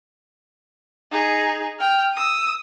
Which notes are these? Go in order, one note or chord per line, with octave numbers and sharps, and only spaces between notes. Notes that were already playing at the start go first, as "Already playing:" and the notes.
D#4 G#4
G5 F6
D#6 E6